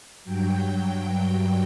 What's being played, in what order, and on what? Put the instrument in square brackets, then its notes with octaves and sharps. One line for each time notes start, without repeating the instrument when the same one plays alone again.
[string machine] G2 F#3 G5
G2 F#3